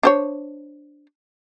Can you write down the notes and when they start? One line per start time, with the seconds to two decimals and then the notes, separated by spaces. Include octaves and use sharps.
0.03 D4 C5 C#5